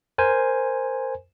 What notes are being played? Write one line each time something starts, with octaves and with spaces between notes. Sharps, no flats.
A#4 C5 G#5